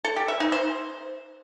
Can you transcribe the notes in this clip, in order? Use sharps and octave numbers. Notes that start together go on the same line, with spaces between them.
A4
G4
E5
D#4
C5